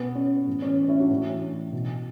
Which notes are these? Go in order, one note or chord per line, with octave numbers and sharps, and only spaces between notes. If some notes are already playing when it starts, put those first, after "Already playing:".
Already playing: B2 B3
C#4
A2 E3
C#4
C#4 E4
D4 F#4
A2 E3
B2